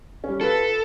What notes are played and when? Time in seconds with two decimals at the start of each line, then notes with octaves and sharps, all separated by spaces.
0.24 G3 C#4
0.41 F4 A4 B4